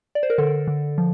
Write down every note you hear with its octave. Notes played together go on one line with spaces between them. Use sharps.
D5
C5
A#4
D3 A4
D3
F3